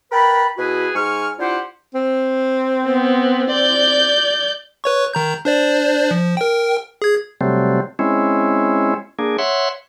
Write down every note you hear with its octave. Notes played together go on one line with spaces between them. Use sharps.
A#4 B4 G5 A5 B5
B2 E4 F#4 G#4 B4
G#2 G#5 C#6 F6
D4 E4 F4 G4 C5 F#5
C4
B3
D5 G6
B4 C#5 C#6
D#3 A#5 G6
D4 C5 D5
F3
A#4 G5
G#4 G#6
C3 F#3 G3 A3 C4
G#3 C4 C#4 E4
A#3 D4 G#4
C#5 E5 F#5 C6